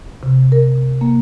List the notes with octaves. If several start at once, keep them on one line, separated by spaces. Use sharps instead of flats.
C3
A#4
A#3